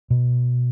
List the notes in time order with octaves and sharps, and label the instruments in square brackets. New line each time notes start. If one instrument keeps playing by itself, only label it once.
[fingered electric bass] B2